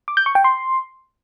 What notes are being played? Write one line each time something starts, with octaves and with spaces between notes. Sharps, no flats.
D6
G6
C#6
G5
C6